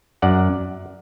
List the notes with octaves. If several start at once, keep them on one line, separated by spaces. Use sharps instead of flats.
F#2 D5 F#5